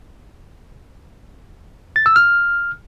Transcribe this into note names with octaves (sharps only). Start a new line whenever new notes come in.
A6
E6
F6